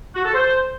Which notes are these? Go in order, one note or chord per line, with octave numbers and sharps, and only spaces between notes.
F#4
A4
C5